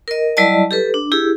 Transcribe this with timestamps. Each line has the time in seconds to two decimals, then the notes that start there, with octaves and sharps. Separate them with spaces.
0.08 A#4 D#5
0.37 F#3 G3 E4 D5 D#5 A5
0.71 G4 A4 B4
0.94 D4
1.12 E4 G4 G#4